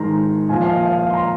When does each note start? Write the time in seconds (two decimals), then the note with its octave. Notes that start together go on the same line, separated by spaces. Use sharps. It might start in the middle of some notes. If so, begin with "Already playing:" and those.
Already playing: G#2 D#3 A#5 C6
0.49 A#2 F3 G#5
0.62 F5
0.73 D#5
0.85 F5
0.98 F5
1.10 C6
1.14 A#5